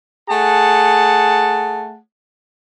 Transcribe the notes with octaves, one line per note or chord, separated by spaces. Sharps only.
A3 G#4 F#5 A5